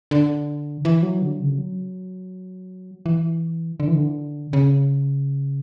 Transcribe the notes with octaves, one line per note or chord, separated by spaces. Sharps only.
D3
E3
F#3
D3
C#3
F#3
E3
D3
E3
D3
C#3